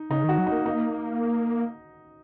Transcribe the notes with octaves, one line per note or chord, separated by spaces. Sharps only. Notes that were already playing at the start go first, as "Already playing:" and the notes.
Already playing: D#4
C#3 D#4
D#3 F#4
F#3
D#4
A#3
D#4